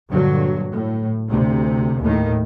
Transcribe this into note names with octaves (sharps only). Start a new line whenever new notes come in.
G2 A#2 D3 F#3
A2
D2 C3
D#2 A2 D#3